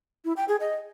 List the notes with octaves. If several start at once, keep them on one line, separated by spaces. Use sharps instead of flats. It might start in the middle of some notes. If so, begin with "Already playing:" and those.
E4
G5
G#4
D#5